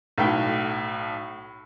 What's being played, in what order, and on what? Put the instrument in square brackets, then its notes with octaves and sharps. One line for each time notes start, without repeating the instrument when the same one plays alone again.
[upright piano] B1 A2 G5